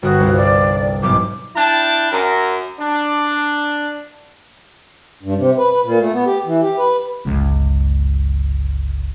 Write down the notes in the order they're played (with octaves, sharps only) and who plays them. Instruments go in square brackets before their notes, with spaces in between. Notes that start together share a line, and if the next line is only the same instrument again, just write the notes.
[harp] G1 D#6 [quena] F#4
[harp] C2 G2 F4
[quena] D5
[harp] B1 G#2 [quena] D6
[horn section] D4 E4 G5 A5
F#2 A#4
D4
[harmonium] G2
C3
B4
B4
A#2
A3
B3
G4
E3
G4
B4
[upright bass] G1 C#2